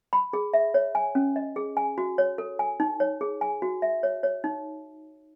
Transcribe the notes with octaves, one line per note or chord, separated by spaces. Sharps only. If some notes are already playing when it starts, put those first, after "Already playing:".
B5
G#4
E5
C#5
G#5
C#4
D#5
G#4
G#5
F#4
C#5
A4
G#5
D#4
C#5
G#4
G#5
F#4
E5
C#5
C#5
D#4